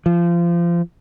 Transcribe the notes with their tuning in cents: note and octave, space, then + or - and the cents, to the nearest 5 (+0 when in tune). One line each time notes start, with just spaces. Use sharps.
F3 -25